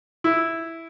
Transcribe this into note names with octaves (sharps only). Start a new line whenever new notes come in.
E4